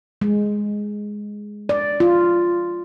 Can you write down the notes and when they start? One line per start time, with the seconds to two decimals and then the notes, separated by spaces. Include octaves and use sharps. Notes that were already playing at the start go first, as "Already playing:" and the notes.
0.21 G#3
1.69 D5
2.00 F4